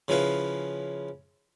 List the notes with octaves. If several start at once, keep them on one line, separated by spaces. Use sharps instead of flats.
C#3 F3 E4 B4 F5